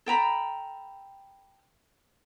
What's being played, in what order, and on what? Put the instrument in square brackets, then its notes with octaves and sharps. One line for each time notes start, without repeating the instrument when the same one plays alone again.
[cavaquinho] A4 G5 A#5 B5